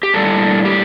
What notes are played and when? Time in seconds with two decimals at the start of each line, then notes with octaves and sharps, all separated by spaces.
0.03 G4
0.14 A2 G3 A#3 D4 A4
0.65 G4